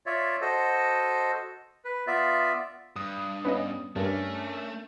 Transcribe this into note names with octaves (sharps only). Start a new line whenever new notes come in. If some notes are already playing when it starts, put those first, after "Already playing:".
F4 C#5 D5 E5
F#4 A4 C5 D#5
B4
B3 F4 D5 E5
G2 D#6
B3 C#4 D#5
G2 A3 C#4 D4 A#4